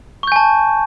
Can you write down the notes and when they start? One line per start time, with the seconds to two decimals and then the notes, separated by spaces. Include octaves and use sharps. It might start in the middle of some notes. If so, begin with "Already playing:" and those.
0.23 C#6
0.27 G6
0.32 G#5
0.36 A5